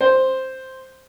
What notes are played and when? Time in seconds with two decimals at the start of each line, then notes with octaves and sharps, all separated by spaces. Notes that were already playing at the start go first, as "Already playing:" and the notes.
0.01 C5